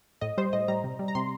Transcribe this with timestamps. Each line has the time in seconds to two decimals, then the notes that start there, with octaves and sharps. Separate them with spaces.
0.21 A2 D#5
0.38 G3 C5
0.53 A2 D#5
0.68 G3 A#5
0.84 C3
0.99 G3
1.08 A#5
1.15 C3 C6